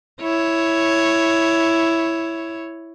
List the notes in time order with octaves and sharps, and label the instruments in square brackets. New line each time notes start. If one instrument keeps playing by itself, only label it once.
[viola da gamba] E4 C#5